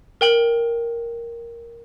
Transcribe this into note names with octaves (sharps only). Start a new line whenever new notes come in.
A#4 G5 F#7